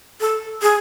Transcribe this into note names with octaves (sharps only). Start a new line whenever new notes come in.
A4
G#4